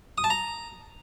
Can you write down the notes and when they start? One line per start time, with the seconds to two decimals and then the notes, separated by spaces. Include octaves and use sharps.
0.18 D#6
0.24 A5
0.30 A#5